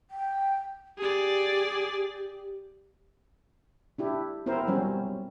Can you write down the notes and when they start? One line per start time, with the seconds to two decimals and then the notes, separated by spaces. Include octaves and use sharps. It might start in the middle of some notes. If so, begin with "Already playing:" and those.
0.11 G5
0.98 G4 G#4 D5
3.98 D4 E4 G4
4.46 B3 C4 E4 A#4 C5
4.67 F#3 G3 C4 C#4